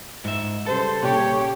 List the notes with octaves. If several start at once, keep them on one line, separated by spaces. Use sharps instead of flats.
G#2 E5
C#3 G3 A4 B4 C5
A#2 C#3 G3 G4 C#5